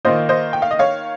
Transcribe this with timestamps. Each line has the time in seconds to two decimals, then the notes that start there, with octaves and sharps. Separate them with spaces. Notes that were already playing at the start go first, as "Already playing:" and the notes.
0.05 D#3 A#3 F4 C5 D#5
0.29 C5 D#5
0.53 G5
0.62 F5
0.71 D#5
0.79 C#5 F5